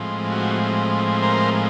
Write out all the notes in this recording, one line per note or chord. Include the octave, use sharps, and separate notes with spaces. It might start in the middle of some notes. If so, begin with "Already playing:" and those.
Already playing: A2 F3 G#3 C4
F#4
A#4 C5